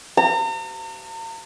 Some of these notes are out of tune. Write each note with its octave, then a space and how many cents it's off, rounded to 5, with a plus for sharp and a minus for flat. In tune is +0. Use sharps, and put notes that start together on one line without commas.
A#5 -45